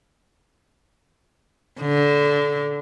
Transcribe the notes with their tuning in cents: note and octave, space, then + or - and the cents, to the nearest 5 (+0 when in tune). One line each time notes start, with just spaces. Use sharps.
D3 -20